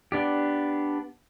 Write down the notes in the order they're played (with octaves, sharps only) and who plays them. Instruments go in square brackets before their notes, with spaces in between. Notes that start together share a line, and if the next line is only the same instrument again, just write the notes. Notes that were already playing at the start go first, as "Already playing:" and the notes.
[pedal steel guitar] B3 D4 G4